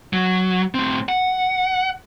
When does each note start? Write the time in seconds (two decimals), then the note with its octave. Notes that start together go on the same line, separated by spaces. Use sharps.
0.13 F#3
0.74 A2 C4
1.09 F#5